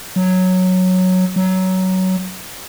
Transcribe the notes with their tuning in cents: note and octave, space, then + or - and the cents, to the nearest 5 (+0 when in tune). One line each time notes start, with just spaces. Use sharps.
F#3 -5
F#3 +15